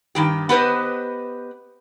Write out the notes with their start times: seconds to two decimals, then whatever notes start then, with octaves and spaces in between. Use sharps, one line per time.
0.15 G2 D#3 G4
0.49 B3 G4 B4 C5 D#5